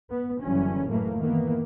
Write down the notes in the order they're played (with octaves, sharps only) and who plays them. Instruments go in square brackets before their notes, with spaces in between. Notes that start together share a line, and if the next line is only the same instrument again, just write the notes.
[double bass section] B3
F#1 D3 E3 F#3 G3 C#4
A2 E3 F#3 A3 A#3
D#3 E3 A#3 B3